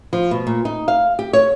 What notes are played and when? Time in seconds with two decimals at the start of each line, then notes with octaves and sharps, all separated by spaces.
0.13 F3
0.31 B2
0.47 A#2
0.65 D#4
0.88 F5
1.19 G4
1.33 C#5